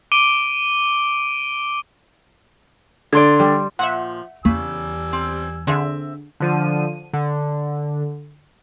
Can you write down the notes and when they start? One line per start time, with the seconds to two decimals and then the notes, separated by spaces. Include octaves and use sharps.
0.12 D6 D7 D#7 G7
3.13 D3 D5 C6 G#6
3.39 G3
3.79 A#2 F3 E5 F#5
4.45 E2 C#3 G3 G#5 E6
5.13 C4
5.67 D3 C4 G#4 E5
6.40 D3 F3 D#7
7.13 D3